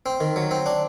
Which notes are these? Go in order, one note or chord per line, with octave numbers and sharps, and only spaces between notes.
C4
D#3
F#3
C4
D4